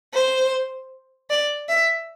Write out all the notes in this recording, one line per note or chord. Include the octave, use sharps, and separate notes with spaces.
C5
D5
E5